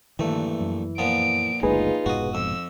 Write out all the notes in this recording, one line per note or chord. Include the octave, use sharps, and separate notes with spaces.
A#1 G2 D#3 E3 A3
F#2
A#2 F3 B3 D7
F#1 D2 G#3 D#4 F4 G#4 B4
F1 G#2 B2 F#4 D#5
F2 E6